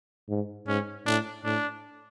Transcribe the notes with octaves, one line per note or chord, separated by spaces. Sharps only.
G#2
G#2 C#4
A2 D4
A2 D4